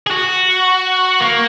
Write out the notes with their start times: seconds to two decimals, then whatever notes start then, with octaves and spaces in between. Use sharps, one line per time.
0.07 G#4
0.11 F#4
1.21 A#3